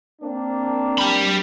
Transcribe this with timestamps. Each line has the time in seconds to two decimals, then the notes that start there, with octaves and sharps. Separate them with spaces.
0.22 A#3 C4 D4
0.98 G4 B5